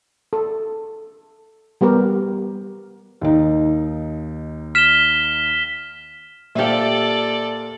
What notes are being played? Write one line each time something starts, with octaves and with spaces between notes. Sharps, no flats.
A4
G3 B3 G4 A#4 B4
D#2 D#4
F6 B6 E7 G7
A#2 G4 A4 C5 D5 E5 F5